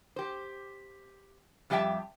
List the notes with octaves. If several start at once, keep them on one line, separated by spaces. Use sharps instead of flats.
G4 C5
F2 G3 G4 E5 G5 A5